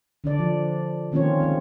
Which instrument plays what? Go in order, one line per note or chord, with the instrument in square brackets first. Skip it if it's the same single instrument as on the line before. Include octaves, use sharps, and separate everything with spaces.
[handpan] D3 D4 D5
F3
D#3 A#3 C4 C#4 F4 C#5
G#3 C4